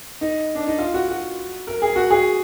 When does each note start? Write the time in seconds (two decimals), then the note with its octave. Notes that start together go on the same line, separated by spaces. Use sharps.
0.21 D#4
0.55 D4
0.67 D#4
0.79 F4
0.94 F#4
1.09 F#4
1.67 A#4
1.82 G#4
1.96 F#4
2.10 G#4